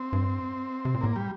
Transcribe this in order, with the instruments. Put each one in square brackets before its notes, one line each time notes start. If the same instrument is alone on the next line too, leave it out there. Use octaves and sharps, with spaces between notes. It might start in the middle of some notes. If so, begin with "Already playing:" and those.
Already playing: [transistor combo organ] C4
[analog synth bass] G2
C3
A#2
[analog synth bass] A2 [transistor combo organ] A#3
[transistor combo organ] G3